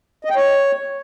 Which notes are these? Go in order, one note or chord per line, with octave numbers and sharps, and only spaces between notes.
D#5
G5
C#5